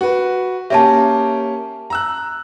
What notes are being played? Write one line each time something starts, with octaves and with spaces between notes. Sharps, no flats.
F#4 B4
A#3 C#4 G4 E5 A5
A#5 E6 F#6